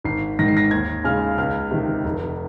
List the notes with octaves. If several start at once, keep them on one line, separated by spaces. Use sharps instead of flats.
G#1 C7
G#2 D#3 A#6
C7
A#6
D#2 G#6
C#3 G#3 C#4 F4 F6
C#2 F6
C3 D#3
F1